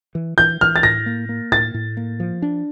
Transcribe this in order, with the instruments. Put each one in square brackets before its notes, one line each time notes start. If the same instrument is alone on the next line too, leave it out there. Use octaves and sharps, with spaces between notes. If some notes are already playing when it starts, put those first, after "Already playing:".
[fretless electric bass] E3
[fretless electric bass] E3 [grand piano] G6
[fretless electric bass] E3 [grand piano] F6
[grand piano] A6
[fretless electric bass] A2 [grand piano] A#6
[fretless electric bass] A#3
A#3
[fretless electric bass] A2 [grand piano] A6
[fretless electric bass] A2
A#3
F3
D4